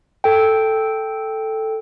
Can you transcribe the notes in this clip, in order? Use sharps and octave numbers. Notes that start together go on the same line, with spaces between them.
A4 G5